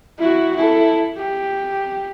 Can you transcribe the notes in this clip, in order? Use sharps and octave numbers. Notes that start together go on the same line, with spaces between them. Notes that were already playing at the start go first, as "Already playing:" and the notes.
E4 F#4
E4 A4
G4